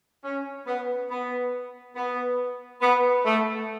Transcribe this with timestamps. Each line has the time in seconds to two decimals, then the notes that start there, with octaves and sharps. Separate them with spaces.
0.24 C#4
0.67 B3
1.10 B3
1.96 B3
2.82 B3
3.25 A3